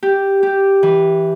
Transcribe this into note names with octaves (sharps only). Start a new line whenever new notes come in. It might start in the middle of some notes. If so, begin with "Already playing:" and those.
G4
G4
E3